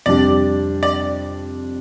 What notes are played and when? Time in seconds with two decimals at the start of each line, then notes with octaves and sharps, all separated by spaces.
0.06 F2 C3 G3 D4 G4 D5
0.83 D5